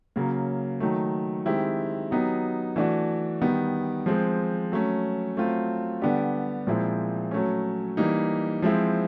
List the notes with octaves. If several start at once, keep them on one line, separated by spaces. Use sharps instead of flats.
C#3 F#3 A#3
D#3 F#3 A3
D#3 G#3 C4 E4 G4
F#3 B3 D#4 G4
E3 A3 D4 F#4
D#3 G3 B3
F3 G#3 C4
F#3 A3 C#4
F#3 A3 C4 F4
D3 G3 B3 D4 G4
A#2 F3 G#3 C4 E4
F#3 A3 C#4
E3 G3 A#3 D#4
F3 G#3 C4 E4